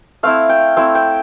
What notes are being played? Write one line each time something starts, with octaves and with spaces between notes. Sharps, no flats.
A3 C4 E4 F5
G5
A3 C4 E4
G5